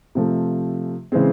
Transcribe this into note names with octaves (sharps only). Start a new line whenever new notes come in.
C3 F3 A3
C#3 E3 G#3 C4